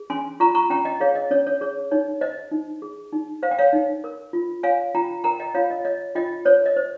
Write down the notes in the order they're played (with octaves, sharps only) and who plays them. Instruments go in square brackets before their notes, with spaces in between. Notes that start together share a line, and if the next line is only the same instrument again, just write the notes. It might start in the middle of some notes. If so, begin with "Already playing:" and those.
Already playing: [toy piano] G#4
C#4 G#5 C6
F4 A#5 C#6
A#5 C#6
C#4 G5 A#5
D#5 G5
G#4 C#5 F5
D#5
C#4 C#5
C#5
G#4 C#5
D#4 C#5
C5 D#5
D#4
G#4
D#4
C5 F5
G5
C#5 F5
D#4
A#4
F4
C#5 F5 G#5
F4 G5 A#5
A#4 G5 A#5
D#5 G5
F4 C#5 F5
D#5
C#5 D#5
F4 D#5 G5
C5 C#5
D#5
C5